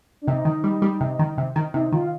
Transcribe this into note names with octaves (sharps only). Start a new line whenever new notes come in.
D4
C3 D#4
D#3
G3
G3
C3
D#3
C3
D#3
C3 D#4
D#3 F4